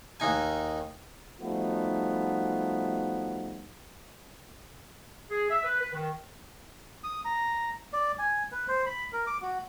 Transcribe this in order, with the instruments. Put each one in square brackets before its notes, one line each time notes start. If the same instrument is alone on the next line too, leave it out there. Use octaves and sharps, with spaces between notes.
[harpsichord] D#2 D#3 D#4 G#5
[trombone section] F3 G3 A3 B3 D#4 F#4
[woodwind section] G#4
E5
B4
B4
D#3
[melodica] D#6
A#5
D5
G#5
B4
C5
B5
A#4
D6
F#4